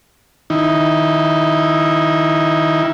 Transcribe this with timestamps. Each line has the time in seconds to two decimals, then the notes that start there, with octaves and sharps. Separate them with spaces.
0.50 D#3 D#4 E4